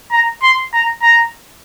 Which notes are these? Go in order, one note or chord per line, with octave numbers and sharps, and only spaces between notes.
A#5
C6
A#5
A#5